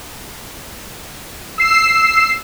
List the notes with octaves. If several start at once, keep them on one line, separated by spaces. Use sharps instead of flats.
E6 C7 E7